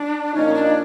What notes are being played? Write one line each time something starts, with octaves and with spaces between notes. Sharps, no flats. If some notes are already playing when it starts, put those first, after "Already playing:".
Already playing: D4
A#2 F3 A#3 C#4 D#4
D4